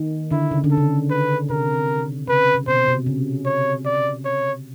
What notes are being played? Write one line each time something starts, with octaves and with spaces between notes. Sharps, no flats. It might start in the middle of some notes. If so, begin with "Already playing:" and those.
Already playing: D#3
D3 E4
C#3
D3
A4
C#3
B4
C3 A#4
C#3 B4
C3
B2 C5
C3
C#3
C#5
D5
C#5